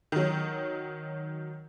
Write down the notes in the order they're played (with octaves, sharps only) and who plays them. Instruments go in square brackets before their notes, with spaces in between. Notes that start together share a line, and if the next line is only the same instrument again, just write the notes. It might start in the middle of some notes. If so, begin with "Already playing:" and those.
[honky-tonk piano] D#3 F#3